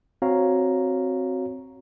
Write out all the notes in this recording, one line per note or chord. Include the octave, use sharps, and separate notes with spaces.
C4 F#4 C#5 F5 A#5